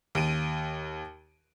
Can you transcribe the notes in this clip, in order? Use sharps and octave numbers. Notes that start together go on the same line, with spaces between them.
D#2 D7 D#7